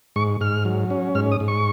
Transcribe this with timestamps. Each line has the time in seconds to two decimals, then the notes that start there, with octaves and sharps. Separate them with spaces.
0.16 G#2 C#6
0.41 G#2 F6
0.65 F#3
0.90 C#4
1.15 G#2 F6
1.32 D#6
1.40 G#2
1.48 C#6